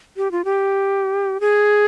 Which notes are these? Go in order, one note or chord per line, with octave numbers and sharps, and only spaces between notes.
G4
F4
G4
G#4